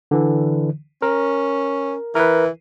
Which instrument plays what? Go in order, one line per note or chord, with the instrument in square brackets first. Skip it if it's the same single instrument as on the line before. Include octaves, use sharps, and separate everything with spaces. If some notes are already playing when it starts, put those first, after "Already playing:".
[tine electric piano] D3 E3
[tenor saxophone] C#4 [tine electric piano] A#4
[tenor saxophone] E3 [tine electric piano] A#4 B4